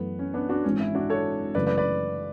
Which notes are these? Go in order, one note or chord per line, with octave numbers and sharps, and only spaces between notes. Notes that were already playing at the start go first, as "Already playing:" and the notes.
Already playing: F#2 E3 A3 B3
C#4
B3 D4
D4 F#4
G#1 G#2 E3 C#4
C#4 E4
D4 F#4
A4 C#5
F#2 C#3 E3 A3 B4 D5
B4 D5
B4 D5